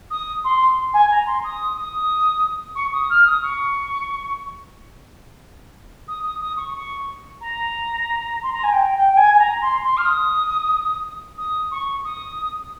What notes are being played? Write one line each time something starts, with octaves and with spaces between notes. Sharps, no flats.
D#6
C6
G#5
A#5
C6
D#6
D#6
C#6
D#6
F6
D#6
C#6
D#6
D#6
D#6
C#6
C#6
A#5
C6
A#5
G#5
G5
G5
G5
G#5
G#5
A#5
C6
C6
F6
D#6
D#6
C#6
D#6